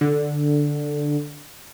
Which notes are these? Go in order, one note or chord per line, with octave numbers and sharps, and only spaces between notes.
D3